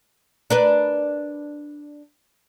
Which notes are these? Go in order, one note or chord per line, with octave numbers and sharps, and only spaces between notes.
D4 A#4 B4